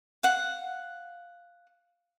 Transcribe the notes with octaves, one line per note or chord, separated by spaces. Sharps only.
F5 F#5